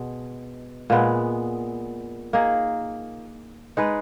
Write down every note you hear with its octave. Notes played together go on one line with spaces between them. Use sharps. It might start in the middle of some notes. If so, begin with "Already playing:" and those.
Already playing: B2 G#3
A#2 G#3 B3
A#3 D#4 G#4
G#3 D#4 G#4 B4